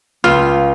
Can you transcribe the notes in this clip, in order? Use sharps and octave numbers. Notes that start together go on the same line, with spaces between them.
C#2 F4